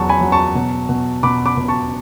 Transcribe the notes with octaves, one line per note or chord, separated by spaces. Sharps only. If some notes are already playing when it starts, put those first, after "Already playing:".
Already playing: E2 F#3 A5 C#6
G#5 B5
F#3
A5 C#6
B2
B2
B2 B5 D6
B5 D6
B2
A5 C#6